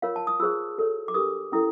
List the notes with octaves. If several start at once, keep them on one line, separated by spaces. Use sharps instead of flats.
F4 A#4 C#5 F5
A5
D#6
F4 G#4 C5 E6
F#4 A4 C#5
D6
D4 G4 A#4 D#6
C#4 E4 A4 D#6